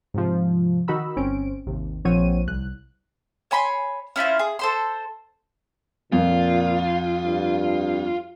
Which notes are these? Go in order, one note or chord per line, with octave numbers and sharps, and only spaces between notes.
G#2 C3 F3
D#3 D#4 F#4 A#4 B5 E6
G1 C4 C#4 D7
G#1 D#2 C3
A#1 F3 C4 C#5 F#5 D#7
C2 F#6
C#5 G#5 B5 C6
C#4 E4 F4 C5
G#4
A4 C5 C6
F2 A#2 F4
G2